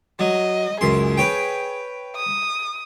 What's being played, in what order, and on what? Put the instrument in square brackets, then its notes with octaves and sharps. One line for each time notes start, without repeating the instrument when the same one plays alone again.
[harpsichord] F#3 [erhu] D#5
[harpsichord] C#2 F#2 C6 [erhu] G#4
[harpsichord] B4 C#5 G5
[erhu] D#6